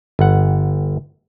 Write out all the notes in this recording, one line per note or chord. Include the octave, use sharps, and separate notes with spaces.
G1 F#5